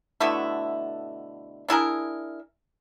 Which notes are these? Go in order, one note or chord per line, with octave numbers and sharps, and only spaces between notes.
B2 D3 A3 E4
D4 E4 G#4 A#4